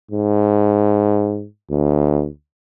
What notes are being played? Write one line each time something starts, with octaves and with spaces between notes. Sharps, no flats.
G#2
D2